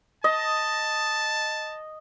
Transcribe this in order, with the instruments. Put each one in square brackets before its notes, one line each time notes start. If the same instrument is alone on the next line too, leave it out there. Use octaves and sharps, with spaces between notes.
[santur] D#5 [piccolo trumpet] A5